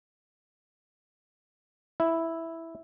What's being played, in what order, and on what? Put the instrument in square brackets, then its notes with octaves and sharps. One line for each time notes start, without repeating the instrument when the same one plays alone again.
[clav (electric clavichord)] E4